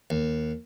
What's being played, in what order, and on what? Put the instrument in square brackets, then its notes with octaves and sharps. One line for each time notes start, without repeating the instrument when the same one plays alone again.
[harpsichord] D#2